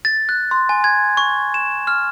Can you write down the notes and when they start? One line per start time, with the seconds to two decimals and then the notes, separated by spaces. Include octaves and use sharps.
0.05 A6
0.29 F#6
0.51 C6
0.69 G#5
0.84 G#6
1.17 C#6
1.54 E7
1.87 F6